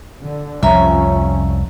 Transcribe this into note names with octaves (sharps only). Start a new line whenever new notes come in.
D3
C2 F2 F3 C#4 E5 A#5